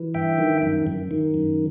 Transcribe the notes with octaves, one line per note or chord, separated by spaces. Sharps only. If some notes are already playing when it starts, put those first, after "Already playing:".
Already playing: E3
G2 E5 G5
D#3
F#2
F#2
D#3
F#2